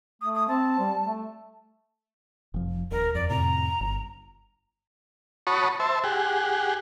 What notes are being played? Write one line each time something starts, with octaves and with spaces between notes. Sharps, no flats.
A3 D#6
D#6
C4 A5
G3
A3
F1 F3
D#1 A#4
F2 D5
F2 A2 C3 A#5
G1
F#4 C#5 A5 B5 C#6 D#6
C5 E5 A5
G4 G#4 F#5